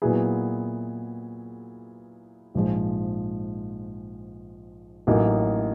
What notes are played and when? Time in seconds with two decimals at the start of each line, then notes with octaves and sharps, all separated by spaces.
0.02 A#2 F#3 B3 E4 G#4
2.55 A#1 G#2 F3 G#3
5.07 A1 A2 F#3 A#3 D#4